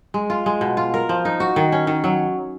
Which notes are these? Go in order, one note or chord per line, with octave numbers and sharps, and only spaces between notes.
G#3
F4
G#3
B2
F4
A#4
F3
D#4
F#4
D#3
C#4
D#3
F#3